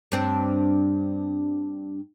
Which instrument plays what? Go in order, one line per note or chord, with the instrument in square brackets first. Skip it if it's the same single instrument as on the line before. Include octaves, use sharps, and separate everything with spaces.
[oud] G2 C4 D4